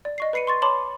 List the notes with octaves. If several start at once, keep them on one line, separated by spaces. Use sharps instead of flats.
D5
D#5 C#6 C7
B4 B5 C7 C#7 D#7
C6 C#6 A6
C#5 A5 B5 C6 D6